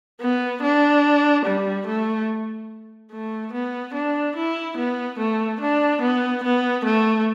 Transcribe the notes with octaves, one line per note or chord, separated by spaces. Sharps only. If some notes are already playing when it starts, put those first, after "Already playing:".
B3
D4
G3
A3
A3
B3
D4
E4
B3
A3
D4
B3
B3
A3